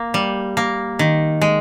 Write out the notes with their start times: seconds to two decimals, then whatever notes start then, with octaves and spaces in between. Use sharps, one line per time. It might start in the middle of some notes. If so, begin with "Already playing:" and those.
Already playing: A#3
0.14 G3
0.57 A#3
0.99 D#3
1.41 G#3